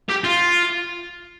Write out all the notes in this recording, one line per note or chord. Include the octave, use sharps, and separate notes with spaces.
G4
F4